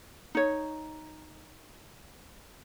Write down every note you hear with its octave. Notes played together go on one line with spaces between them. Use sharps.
D#4 C#5